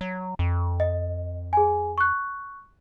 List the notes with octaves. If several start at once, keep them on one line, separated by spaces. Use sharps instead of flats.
F#3
F2
D#5
G#4 G#5
C#6 F#6